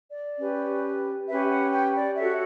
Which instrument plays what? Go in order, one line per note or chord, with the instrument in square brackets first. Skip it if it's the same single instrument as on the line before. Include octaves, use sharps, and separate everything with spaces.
[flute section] D5
C#4 G4 B4
C#4 G4 B4 E5
F#5
G5
D5
F#4 A4 C#5 E5